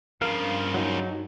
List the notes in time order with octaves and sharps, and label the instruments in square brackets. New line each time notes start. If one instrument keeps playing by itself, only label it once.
[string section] G2 [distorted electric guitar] C#3 F3 [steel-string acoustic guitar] A#4 [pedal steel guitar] F5
[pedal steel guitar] F#3 D#4